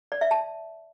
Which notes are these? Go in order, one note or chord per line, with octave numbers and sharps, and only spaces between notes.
D5
E5
A5